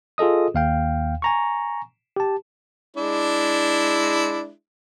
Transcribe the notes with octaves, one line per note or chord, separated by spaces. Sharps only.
F4 G#4 A4 D#5 D#6
D#2 F5 G5
G#5 A#5 C#6
G4 A5
G#3 D4 E4